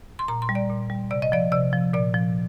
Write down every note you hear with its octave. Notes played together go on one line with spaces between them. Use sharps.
C6
A#2 A#5
C6
G3
D5
A#2
G3
C3 D5
D#5
F3 D5
C3 D5
F3
A#2 D5
F3